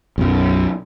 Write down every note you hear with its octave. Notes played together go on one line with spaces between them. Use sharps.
B1 F#2